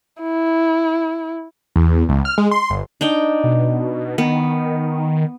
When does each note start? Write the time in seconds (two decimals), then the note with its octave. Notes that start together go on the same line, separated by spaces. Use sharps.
0.22 E4
1.76 E2
2.09 C#2
2.25 F6
2.38 G#3
2.51 C6
2.70 G1
3.01 D4 D#4 G5
3.44 B2
4.18 D#3 B3